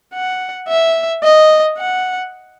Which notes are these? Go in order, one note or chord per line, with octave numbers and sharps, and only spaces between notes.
F#5
E5
D#5
F#5